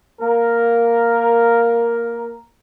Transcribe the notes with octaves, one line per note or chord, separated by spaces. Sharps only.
A#3 A#4